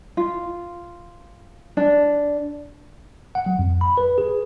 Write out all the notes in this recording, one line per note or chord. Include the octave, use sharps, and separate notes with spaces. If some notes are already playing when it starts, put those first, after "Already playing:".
F4
D4
F#5
F#3
F2
B5
B4
G#4